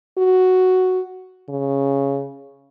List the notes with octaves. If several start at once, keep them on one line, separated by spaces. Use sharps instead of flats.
F#4
C#3